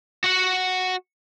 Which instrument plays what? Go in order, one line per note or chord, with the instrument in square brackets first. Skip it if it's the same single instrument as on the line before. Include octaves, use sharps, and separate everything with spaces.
[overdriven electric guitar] F#4 F#5